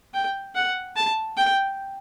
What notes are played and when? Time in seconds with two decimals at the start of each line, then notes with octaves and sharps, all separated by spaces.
0.14 G5
0.55 F#5
0.96 A5
1.37 G5